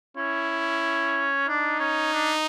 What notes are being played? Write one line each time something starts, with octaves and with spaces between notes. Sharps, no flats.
C#4 E4
D4 D#4
C#4
D4